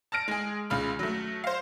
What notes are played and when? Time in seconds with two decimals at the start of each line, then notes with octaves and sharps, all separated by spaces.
0.12 A5 F6 A#6 D7
0.28 G#3 G#4
0.70 C#2 C#3 B5 F6
0.99 F#3 A3
1.44 C5 F5